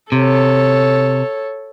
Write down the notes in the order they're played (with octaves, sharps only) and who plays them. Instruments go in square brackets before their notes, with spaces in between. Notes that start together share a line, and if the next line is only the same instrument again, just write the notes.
[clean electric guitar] C3 [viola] A4 C#5